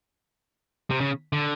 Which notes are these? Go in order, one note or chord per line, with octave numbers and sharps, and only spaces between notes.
C3
C#3
D3